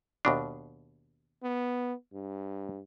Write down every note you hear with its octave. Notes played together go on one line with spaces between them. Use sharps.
D#2 B2 D4
B3
G2